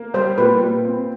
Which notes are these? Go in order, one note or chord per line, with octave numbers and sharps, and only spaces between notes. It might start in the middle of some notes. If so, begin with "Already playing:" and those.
Already playing: A#3
G3 C5
A#2 B4
A#2
C4